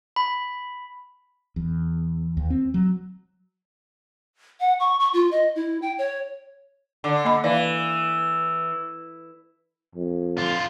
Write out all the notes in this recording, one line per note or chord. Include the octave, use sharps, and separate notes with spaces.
B5
E2
D#2
C4
F#3
F#5
C#6
C#6
F4
D#5
E4
G5
C#5
D3
A#3 D#5 B5
E3 D5 F5
F2
D3 F4